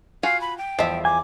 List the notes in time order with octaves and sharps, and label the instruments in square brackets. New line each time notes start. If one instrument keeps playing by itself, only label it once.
[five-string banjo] F4 F#4 G#5 [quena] F5
[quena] B5
G5
[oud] E2 E5 [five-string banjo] F3
[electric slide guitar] G#5 [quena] D6